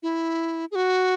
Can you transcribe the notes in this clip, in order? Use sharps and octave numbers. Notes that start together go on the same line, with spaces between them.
E4
G#4
F#4